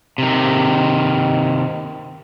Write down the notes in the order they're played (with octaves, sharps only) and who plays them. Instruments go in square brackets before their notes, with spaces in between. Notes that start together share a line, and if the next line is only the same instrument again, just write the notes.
[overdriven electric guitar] C3 D#3